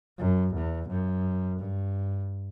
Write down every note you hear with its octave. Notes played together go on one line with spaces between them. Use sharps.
F#2
E2
F#2
G2